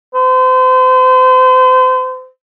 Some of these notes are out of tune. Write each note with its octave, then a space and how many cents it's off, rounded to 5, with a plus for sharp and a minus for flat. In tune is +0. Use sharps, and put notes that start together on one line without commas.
C5 -35